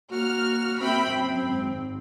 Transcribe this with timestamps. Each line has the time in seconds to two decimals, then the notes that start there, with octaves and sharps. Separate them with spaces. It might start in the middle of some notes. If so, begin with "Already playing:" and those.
0.12 A#3 F#4 F6
0.81 C4 E5 G5 B5
1.11 F#2
1.50 G#1